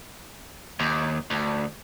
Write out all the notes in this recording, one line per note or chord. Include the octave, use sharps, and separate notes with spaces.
D#2
D2